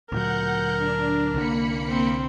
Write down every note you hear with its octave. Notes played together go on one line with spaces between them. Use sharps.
D2 A#2 F#3 A#4 F#5 G6
D4
C2 D3 A#3 D4 B5 C#7
C4